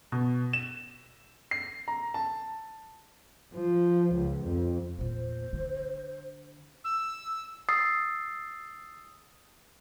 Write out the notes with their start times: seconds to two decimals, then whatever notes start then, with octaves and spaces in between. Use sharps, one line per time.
0.12 B2
0.53 E7
1.51 C7
1.88 A#5
2.14 A5
3.55 F3
4.14 C#2
4.45 F2
4.98 E2 A#2 C5
5.53 D3
6.84 E6
7.69 D#6 E6 A6 C7